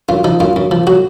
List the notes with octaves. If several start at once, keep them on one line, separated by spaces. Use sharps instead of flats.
F#2 F4
F3 D#4
F#2 F4
F#2
F3
F#3 F#4